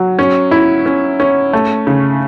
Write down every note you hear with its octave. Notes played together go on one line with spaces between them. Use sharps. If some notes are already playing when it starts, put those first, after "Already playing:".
Already playing: F#3
C#4
E4
C#4
C#4
A3
C#3